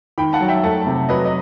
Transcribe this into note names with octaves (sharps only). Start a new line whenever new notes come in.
D#3 G5 B5
F#5 A5
F#3
E5 G5
A3 F#5 A5
C3
F#3 B4 D#5
D#5